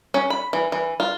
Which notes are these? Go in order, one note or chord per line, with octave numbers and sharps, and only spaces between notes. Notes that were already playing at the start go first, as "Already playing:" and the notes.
C#4
B5
E3
E3
F4